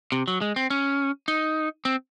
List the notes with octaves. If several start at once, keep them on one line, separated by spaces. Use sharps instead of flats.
C3
F#3
G#3
C4
C#4
D#4
C4